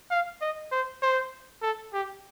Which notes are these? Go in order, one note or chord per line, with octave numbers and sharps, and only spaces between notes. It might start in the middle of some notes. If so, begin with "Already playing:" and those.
F5
D#5
C5
C5
A4
G4